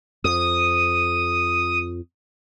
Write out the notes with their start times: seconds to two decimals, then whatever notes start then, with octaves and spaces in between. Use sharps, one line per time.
0.24 F2 D#6